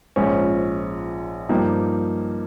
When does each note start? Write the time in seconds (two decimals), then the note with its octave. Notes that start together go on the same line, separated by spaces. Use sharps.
0.16 A#1 G#2 F3 G#3 C#4
1.49 G2 F3 A#3 D#4 G4